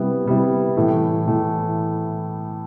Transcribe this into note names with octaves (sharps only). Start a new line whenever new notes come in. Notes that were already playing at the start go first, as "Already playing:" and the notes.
Already playing: C3 G3 B3 E4
C3 G3 B3 E4
A2 E3 A3
A2 E3 A3